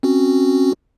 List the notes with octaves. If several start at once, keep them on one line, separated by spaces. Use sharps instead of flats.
C4 C#4 F#4